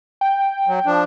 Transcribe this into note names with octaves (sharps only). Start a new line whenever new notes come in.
G5
F#3
F3 D4